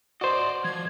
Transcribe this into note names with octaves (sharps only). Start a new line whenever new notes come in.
F#4 C5 D5 D#5
F3 G#6